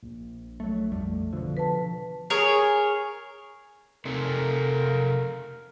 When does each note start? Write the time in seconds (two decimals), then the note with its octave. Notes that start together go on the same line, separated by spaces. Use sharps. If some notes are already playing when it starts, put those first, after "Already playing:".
0.03 A#1
0.60 F#3 A3
0.92 F2 G3 A3
1.33 B2 D3 F3
1.57 B4 A5
2.30 G#4 A#4 C#5
4.05 C3 C4 A4 A#4